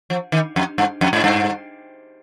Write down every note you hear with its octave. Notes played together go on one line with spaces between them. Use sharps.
F3
D#3
F2
G2
F2
G#2
G2